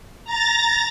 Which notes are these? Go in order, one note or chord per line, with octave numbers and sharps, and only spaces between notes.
A#5 A6 A#6